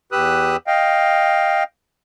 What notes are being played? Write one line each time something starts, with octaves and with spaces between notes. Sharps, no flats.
E2 G4 B4 D#6 E6 F#6
D#5 F5 G5